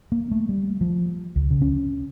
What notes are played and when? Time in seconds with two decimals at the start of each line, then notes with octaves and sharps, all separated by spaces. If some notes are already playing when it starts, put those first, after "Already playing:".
0.12 A#3
0.31 A3
0.49 G3
0.81 F3
1.36 C#2
1.50 C#3
1.62 C#4